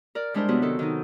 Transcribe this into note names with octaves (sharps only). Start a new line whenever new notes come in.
A#4 D5
G3 G#3 D4 E4 A#4 C5
C3 F#3 B3 E4 F#4
D#3 A4
D#3 D#4